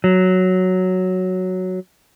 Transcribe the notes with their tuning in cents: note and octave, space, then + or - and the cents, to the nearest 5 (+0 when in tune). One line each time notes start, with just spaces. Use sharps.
F#3 +0